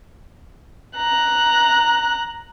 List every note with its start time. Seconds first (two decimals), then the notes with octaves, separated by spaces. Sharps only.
0.97 A#5 F#6